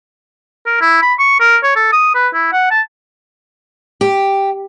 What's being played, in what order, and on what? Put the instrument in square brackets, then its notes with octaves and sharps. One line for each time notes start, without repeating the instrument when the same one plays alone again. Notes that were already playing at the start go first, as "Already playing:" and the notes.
[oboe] A#4
E4
B5
C#6
A#4
C#5
A4
D#6
B4
E4
F#5
A5
[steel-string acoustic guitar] G4